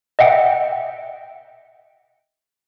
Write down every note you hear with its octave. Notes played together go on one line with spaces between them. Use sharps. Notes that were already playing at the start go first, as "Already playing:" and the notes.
D#5 E5 F#5 G5